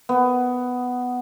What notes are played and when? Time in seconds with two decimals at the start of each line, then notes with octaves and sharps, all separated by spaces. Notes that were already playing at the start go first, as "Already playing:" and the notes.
0.09 B3